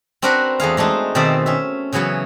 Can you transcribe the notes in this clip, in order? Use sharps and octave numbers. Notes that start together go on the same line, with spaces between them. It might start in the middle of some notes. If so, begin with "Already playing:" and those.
C4 D4 F#4 A#4 B4 F#5
E2 A3 G#4 F5
G#3 A3 D4 D#4
B2 D#3 C4 D5 E5 A5
C#4 E5
C#3 E3 F#3 B3 C#5